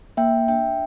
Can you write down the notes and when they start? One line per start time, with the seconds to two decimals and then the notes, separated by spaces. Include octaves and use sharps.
0.17 A#3 E5 G5
0.48 D4 E5 G5